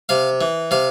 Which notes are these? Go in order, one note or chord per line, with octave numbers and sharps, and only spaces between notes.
C3 F5
E3
C3 F5